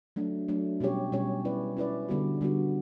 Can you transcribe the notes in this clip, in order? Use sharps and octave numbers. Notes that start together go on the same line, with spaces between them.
F#3 A3 D4
F#3 A3 D4
B2 G3 C#4 G4 C#5
B2 G3 C#4 G4 C#5
C#4 E4 B4 D5
C#4 E4 B4 D5
D3 G3 B3 F#4
D3 G3 B3 F#4